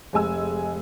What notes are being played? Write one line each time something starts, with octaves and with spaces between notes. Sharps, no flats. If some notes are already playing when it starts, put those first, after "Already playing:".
F1 G#3 G#5 E6